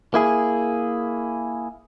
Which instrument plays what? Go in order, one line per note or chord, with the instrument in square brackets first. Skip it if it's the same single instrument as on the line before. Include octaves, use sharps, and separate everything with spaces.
[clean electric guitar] A#3 E4 G#4